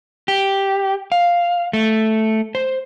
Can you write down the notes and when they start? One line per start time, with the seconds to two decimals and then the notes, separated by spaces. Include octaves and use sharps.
0.28 G4
1.12 F5
1.73 A3
2.55 C5